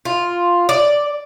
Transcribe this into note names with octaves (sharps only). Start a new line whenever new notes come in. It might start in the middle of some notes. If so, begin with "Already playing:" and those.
F4
D5